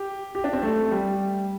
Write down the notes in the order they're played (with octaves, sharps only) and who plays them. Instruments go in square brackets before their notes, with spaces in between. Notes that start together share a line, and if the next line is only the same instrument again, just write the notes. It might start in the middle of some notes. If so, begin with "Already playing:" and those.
Already playing: [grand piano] G4
G4
D4
C4
A3
G3